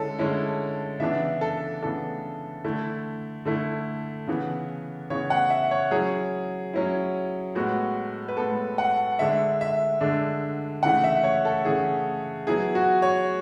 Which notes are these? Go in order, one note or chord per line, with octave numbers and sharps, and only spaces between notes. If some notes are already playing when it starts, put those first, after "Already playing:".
Already playing: D3 G#3 C#4 E4 A4
D3 G#3 C#4 E4
C#3 E3 B3 D4 E5
A4
C#3 E3 B3 D4 A4
D3 A3 E4
D3 A3 E4
C#3 E3 B3
C#3 E3 B3 C#5
F#5
E5
C#5
F#3 C#4 E4 G#4
F#3 C#4 E4
A2 G#3 B3 F#4
B4
A2 G#3 B3 A4
F#5
D3 G#3 D4 E5
E5
D3 G#3 D4
C#3 E3 A3 F#5
E5
C#5
A4
C#3 E3 A3 G#4
F#3 B3 E4 G#4
F#4
C#5